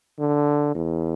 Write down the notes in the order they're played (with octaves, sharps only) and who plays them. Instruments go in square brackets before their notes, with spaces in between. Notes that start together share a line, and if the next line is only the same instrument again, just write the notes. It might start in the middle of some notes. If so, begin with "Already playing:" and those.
[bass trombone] D3
E2